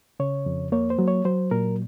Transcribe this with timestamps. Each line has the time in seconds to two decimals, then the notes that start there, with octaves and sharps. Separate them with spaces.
0.20 C#3 C#5
0.46 F2
0.72 A#3 C#5
0.90 C5
0.99 F#3
1.08 C#5
1.25 F#3 C5
1.51 A#2 A#4